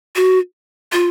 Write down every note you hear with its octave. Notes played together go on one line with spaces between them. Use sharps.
F#4
F4